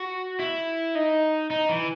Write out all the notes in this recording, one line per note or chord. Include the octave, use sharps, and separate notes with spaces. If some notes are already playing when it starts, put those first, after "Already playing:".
Already playing: F#4
E4
D#4
D#4
E3